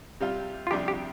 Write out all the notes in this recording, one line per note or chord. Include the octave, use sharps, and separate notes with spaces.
C3 G3 F4
F4
F2 C3 G3 D4 G4
G4